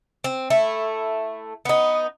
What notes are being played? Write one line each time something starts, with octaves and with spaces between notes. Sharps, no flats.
C4
A3 E4
B3 D#4